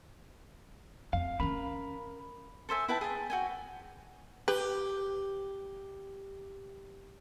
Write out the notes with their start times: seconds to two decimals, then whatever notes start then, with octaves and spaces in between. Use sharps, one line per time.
1.13 F2 F5
1.40 D#3 C#4 A#4 B5
2.69 A4 C5 E5 G#5
2.88 E4 B4 G5 A5
3.01 G#4 G5 A5
3.30 F#4 G5 G#5
4.48 G4 B4